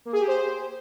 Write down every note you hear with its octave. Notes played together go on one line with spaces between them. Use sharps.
A#3
G#4
G4
C5